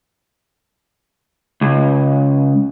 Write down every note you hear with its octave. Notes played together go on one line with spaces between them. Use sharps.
C#2